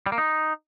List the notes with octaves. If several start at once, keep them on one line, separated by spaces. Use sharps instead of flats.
G3
A#3
D#4